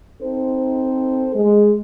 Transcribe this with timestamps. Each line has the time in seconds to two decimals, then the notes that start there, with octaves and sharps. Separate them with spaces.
0.22 C4 D#4 A4 C5
1.33 G#3